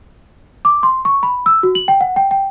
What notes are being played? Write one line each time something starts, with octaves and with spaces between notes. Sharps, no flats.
D6
C6
C#6
B5
E6
F#4
F#7
G5
F#5
G5
G5